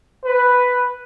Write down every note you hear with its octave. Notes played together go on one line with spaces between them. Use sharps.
B4